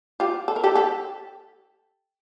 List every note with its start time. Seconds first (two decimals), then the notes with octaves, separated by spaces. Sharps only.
0.20 F4 G4
0.48 A4
0.56 A#4
0.64 G4 A4
0.75 G4 A4